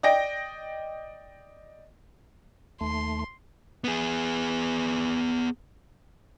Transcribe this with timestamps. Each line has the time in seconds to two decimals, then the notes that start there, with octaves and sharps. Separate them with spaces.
0.03 D5 D#5 G5 A#6 D7
2.81 D#2 A3 C6
3.84 B3 G#4